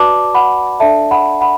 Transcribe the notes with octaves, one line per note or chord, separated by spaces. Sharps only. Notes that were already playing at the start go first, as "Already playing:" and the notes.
Already playing: F#4 B4 D5 A5 D6
F#5 B5
D4 A4 D5 E5 A5
F#5 B5
F#5 B5